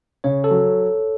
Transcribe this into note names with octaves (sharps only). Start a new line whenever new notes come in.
C#3 C#5
A4
F#3